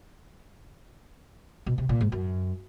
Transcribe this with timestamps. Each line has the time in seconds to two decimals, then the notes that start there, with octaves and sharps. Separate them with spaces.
1.66 B2
1.78 C3
1.89 A#2
2.01 G#2
2.12 F#2